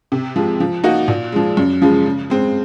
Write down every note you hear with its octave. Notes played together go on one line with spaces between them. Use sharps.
C3
F3 G#3
F3
A#3 D#4 F#4
A#2
F3 G#3
F#2
C#3 F3 G#3
C#3
G#3 C4